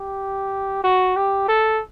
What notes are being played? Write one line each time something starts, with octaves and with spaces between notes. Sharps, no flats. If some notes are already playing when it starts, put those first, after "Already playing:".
Already playing: G4
F#4
G4
A4